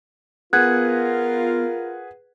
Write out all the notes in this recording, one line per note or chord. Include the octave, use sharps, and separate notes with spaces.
B3 F4 G#4 A#4 B4 F#5 F#6 G#6